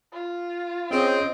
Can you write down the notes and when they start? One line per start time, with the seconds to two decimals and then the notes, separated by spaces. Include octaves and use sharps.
0.13 F4
0.91 C4 C#4 G#4 C#5 D#5